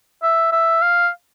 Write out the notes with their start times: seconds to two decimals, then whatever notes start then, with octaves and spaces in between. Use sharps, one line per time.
0.23 E5
0.52 E5
0.82 F5